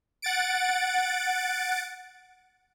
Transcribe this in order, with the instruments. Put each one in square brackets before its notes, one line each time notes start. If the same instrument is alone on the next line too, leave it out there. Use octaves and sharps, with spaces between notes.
[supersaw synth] F#5 A6 D7